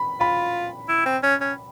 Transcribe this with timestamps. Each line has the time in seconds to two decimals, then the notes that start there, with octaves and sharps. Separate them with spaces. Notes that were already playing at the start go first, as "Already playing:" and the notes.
Already playing: B5
0.20 F4 B5
0.89 E4
1.05 C4
1.23 C#4
1.41 C#4